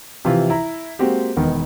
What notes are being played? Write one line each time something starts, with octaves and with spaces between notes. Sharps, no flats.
C3 E3 F3 F4
E4 A#5
G#3 A#3 C4 F#4 G4
E1 D#3 B3 A#4